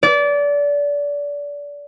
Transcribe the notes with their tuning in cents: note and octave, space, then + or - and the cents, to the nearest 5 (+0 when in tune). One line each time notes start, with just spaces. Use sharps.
D5 -25